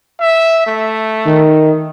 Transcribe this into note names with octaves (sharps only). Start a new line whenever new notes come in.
E5
A3
D#3